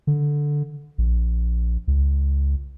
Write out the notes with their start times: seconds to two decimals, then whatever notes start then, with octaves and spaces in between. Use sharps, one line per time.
0.07 D3
0.98 A#1
1.88 C#2